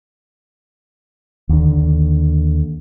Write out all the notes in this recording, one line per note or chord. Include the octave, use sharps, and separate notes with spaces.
D#2 D3